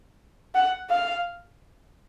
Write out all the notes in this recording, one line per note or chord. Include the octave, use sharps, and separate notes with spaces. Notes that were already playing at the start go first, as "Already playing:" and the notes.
F#5
F5